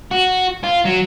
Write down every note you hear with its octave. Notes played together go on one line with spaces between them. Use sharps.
F#4
F4
F#3